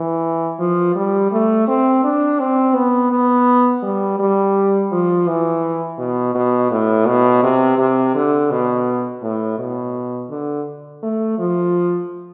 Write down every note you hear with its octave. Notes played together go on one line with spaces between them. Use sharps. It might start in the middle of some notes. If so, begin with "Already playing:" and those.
Already playing: E3
F3
G3
A3
C4
D4
C4
B3
B3
G3
G3
F3
E3
B2
B2
A2
B2
C3
C3
D3
B2
A2
B2
D3
A3
F3